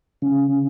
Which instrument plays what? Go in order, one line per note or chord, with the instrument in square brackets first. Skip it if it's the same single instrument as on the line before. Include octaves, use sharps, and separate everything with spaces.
[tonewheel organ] C#3